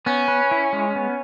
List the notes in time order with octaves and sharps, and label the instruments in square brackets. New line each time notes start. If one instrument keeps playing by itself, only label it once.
[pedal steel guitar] B3 [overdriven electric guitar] C#4
[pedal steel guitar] B4
E4
G#3
B3